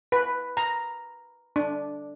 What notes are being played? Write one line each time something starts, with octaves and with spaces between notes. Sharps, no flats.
B4
A#5
D4